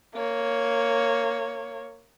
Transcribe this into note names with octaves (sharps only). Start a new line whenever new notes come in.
A#3 C#5